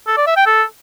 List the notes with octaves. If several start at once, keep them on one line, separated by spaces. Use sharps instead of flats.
A4
D5
E5
G5
A4